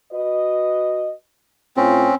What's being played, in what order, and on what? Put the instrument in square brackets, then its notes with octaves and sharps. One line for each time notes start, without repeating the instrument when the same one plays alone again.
[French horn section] F#4 B4 D#5
[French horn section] A2 F4 [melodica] C4 C#4